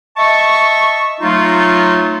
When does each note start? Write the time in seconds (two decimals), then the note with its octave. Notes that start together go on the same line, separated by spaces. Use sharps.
0.17 D#5 E5 A5 C#6
1.21 F#3 A3 D#4 F4